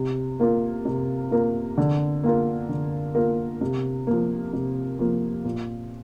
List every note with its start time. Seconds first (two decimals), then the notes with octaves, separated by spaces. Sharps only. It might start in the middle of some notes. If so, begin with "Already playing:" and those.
Already playing: C3
0.40 A#3 F4 A#4
0.85 C3
1.31 A#3 F4 A#4
1.78 D3
2.23 A#3 F4 A#4
2.69 D3
3.15 A#3 F4 A#4
3.61 C3
4.07 F3 A#3
4.53 C3
4.99 F3 A#3
5.45 A#2